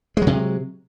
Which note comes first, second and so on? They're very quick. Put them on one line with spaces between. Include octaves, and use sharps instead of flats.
G#3 F#3 C3